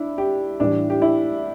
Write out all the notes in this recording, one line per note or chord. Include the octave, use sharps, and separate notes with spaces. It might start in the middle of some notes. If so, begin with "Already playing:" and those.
Already playing: D4 E4
G4
A2 E3 G3 D4
G4
E4